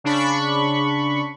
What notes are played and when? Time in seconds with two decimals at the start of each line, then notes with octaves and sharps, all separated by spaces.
0.04 C#3 D4 B5 C#6